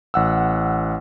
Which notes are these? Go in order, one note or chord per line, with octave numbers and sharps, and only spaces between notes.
A1 F#5 E6